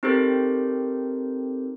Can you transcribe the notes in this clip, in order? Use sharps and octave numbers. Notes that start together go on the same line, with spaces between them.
C4 D#4 G4 A4 A#4 C5